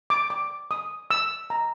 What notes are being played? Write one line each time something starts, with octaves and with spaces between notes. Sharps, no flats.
D6
D6
D#6
E6
A#5